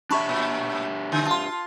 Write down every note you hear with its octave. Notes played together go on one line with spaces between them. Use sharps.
D4 G4 E5 A5 B5 C#6
A#2
D3
F4 A5 C6